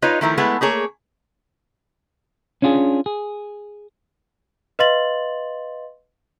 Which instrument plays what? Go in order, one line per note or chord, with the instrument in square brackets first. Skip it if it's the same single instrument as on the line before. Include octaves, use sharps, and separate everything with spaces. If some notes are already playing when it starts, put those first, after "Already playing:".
[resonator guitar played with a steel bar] D#4 F4 B4 C#5 D#5
D#3 F3 A3 E4 F#4 A#4
G#3 A3 B3 E4
A3 A#3 G#4 C#5
[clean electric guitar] C#4 D4 F4 G4 G#4
G#4
[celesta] B4 D#5 F5 C6 A6 F#7